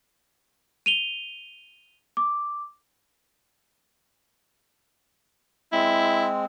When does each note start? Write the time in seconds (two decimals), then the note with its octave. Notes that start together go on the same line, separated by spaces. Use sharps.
0.86 D#7 F7 G7
2.17 D6
5.73 G#3 C4 E4